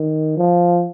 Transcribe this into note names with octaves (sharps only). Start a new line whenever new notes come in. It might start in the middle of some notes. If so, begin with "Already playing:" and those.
Already playing: D#3
F3